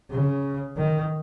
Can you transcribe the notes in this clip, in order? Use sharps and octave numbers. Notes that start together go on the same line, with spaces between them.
C#3
D#3